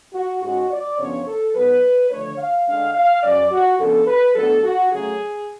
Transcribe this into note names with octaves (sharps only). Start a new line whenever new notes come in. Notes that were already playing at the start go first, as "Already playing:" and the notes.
F#4
G#2 G#3 C#4 F#4
D5
F#2 C#3 F3 B3 D4 C#5
A4
G#2 F#3 B3 B4
D3 F3 A3 D4 C#5
F5
D3 G#3 D4 F5
F5
F#2 C#3 F#3 C#4 D5
F#4
C#3 F3 B3 D4 A4
B4
A2 F#3 B3 D4 A4
F#4
C#3 F#3 A3 G#4